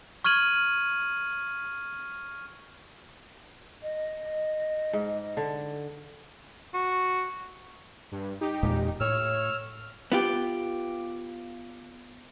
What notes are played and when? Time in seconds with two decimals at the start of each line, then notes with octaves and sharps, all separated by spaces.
0.24 C#6 F6 G#6 D#7 F#7
3.83 D#5
4.93 G#2
5.37 D3
6.74 F#4
8.12 G2
8.41 D#4 G4
8.63 E2 A#2 G#3
9.00 A2 C#5 E6 F6
10.12 B3 F4 G4